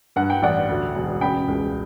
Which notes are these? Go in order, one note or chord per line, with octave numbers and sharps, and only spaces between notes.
G2 F#5
G5
A1 D5 F#5
D2
E1
C#3 G5 B5
C#2